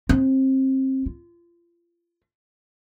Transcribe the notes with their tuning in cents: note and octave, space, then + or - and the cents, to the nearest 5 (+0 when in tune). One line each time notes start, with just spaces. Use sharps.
C4 +25
F4 -30